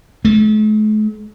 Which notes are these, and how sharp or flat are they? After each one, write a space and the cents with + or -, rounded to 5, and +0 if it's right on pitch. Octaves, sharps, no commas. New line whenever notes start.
A3 -45